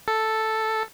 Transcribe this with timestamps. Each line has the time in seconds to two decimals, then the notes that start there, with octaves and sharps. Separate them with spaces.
0.08 A4